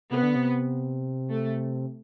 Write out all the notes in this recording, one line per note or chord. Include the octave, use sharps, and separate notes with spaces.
C3 B3
D3
C3
A3